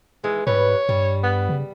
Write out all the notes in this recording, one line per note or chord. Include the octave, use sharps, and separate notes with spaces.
D#3 E3 G#3
G#2 E3 G3 B4 C#5
G2 G3
B3
C#3